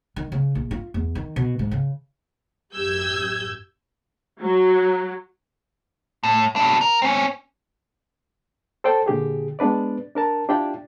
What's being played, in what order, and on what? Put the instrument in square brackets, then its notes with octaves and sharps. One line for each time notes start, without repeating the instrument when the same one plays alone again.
[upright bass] D#3
C#3
A#1
F4
E2
D#3
B2
G#2
C#3
[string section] A1 F#2 G4 E6 G6 G#6
[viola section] F#3
[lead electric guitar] A2
B2 D4
A#4
C4 C#4
[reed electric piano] A4 C5 D5 G5 A5
A#2 D3 G4 G#4
G#3 B3 D4 B4 D5
D4 A#4 A5
D4 E4 F4 G4 D5 G5